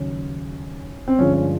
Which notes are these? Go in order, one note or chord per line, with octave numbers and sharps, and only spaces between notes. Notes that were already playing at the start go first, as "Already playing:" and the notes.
Already playing: D#2 C#3 F#3 C#4
C4
G2 D3 F3 G#3 C#4
C#4